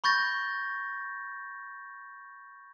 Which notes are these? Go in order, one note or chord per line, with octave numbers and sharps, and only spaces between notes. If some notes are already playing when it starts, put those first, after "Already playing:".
B5 C#6 G6 A6 A#6